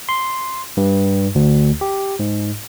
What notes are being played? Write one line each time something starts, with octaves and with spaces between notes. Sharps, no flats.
C6
G2
D2
G4
G#2